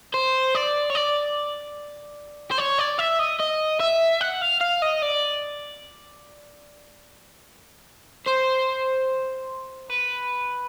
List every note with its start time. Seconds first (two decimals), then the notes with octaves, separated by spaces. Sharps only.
0.14 C5
0.55 D5
0.90 C#5
0.95 D5
2.52 C5
2.58 C#5
2.79 D5
2.99 E5
3.19 D#5
3.39 D#5
3.80 E5
4.21 F#5
4.42 F5
4.61 F5
4.82 D#5
5.02 D5
8.28 C5
9.90 B4